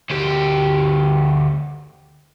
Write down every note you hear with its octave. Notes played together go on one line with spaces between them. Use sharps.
D2 G4